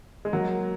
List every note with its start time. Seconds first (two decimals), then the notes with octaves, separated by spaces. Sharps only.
0.25 G#3
0.33 F#3 A#3